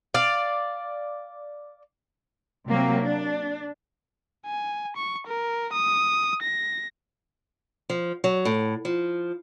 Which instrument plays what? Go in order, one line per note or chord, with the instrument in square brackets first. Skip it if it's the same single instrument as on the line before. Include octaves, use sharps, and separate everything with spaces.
[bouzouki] D5 F5
[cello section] C3 F#3 A#3 C4
D4
[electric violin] G#5
C#6
A#4
D#6
A#6
[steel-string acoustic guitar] F3
F#3
A2
F3